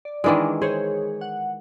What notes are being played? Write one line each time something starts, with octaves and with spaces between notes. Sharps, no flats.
D5
D#3 E3 G#3 D4 A#4 D5
G#4 C5 C#5
F#5